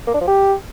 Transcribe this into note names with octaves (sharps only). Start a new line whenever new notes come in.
A#3
D4
F3
G4